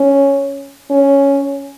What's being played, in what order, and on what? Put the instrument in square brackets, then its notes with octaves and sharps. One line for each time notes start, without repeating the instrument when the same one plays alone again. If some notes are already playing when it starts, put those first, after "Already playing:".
Already playing: [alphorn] C#4
C#4